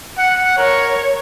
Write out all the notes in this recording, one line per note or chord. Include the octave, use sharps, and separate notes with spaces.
F#5
A#4 C#5